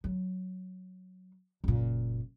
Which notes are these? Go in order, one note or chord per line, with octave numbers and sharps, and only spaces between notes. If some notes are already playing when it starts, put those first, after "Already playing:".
F#3
F#1 A#2